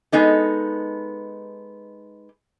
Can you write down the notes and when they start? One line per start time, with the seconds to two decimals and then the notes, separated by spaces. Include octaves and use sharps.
0.12 G#3 B3 D#4 A4